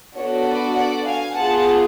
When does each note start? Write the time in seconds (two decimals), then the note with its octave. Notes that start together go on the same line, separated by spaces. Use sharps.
0.17 B3 D4 F#4 A4 C#5
0.47 B4 D5
0.76 D5 F#5
1.06 F5 G#5
1.37 B3 F4 G#4 F#5 A5